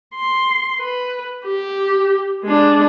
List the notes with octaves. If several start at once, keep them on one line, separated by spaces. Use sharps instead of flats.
C6
B4
G4
G#3 D4